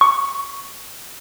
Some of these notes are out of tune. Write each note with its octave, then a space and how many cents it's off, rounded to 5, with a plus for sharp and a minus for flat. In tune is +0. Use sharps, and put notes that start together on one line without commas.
C#6 +5